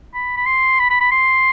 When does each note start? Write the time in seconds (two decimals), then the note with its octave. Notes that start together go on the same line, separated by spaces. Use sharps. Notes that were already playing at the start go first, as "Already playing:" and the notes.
0.14 B5
0.36 B5
0.46 C6
0.79 B5
0.90 B5
1.00 B5
1.11 C6